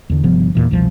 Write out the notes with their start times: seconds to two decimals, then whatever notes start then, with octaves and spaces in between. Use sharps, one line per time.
0.10 E2 D3
0.23 G1 C3 F3 B3
0.55 E2 A#2 E3
0.71 F1 C2 B2 F3